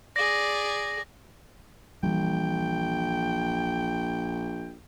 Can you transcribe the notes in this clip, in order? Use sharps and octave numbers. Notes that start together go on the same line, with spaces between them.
G#4 D5 A#6
A#1 E3 G3 G5